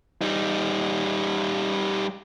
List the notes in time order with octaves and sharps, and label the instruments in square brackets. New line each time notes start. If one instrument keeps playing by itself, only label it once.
[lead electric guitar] G3 D#4